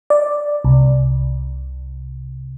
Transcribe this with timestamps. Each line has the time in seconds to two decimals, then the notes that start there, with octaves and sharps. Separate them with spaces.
0.10 D5
0.64 C2